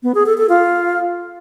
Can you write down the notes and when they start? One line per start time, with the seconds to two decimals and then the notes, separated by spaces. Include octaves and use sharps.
0.03 B3
0.15 G#4
0.26 A4
0.38 A4
0.49 F4